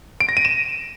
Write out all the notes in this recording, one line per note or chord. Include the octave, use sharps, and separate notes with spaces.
D7
A#6
D#7
E7